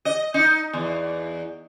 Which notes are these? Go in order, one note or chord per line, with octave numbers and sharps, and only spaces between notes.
D#5
D#4
E2